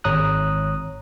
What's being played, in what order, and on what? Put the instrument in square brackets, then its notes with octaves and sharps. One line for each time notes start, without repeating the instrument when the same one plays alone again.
[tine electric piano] G#1 C#5 A#5 D#6 F#6